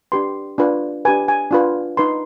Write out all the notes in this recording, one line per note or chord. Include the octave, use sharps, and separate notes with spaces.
D4 G4 B4 C6
D4 F4 B4
D4 G4 B4 G#5
G#5
D4 F4 B4
D#4 B4 C6